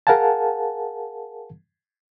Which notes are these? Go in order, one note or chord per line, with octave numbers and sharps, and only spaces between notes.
G#4 A#4 F5 F#5 G#5 A5